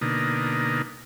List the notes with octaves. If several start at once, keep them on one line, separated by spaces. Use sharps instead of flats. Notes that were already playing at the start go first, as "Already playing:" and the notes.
B2 D3 A#3 D#4